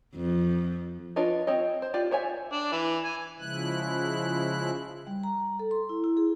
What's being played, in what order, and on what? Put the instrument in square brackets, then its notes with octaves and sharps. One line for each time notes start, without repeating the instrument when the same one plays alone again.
[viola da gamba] F2
[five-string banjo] D4 F4 B4 C#5 D#5
C4 C#5 D#5
C5
F4 G4 D5
C5 C#5 E5 G#5
[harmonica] D4
E3
G#5
[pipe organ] C#3 F3 G#3 E4 F#6
[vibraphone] G3
A#5
A4
C6
E4
E4
G#4